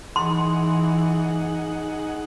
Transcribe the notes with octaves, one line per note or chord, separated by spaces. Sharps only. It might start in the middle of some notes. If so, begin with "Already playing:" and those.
E3 D#4 G#4 F#5 C6